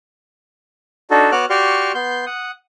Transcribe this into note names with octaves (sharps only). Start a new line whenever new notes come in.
D4 D#4 F#4 A4
B3 F#4 C#5 D6 F6 F#6
F#4 G4 D5 C6 C#6 F6
B3 C6 G6
F#5 D#6